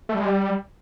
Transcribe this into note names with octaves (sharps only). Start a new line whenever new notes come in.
A3
G3
G#3
G3